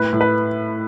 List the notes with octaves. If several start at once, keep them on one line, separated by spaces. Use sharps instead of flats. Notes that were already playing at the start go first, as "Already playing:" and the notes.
Already playing: A2 B4
A2
B4